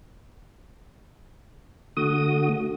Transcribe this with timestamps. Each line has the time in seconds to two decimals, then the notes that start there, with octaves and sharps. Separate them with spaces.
1.97 D3 A3 F#4 D#6